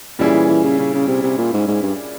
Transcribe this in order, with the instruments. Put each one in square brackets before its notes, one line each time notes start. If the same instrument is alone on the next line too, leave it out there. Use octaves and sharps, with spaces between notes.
[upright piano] A#2 G3 C#4 E4 G#4 [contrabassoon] E3
[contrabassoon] E3
E3
C#3
C#3
C#3
C3
C3
A#2
G#2
G#2
G2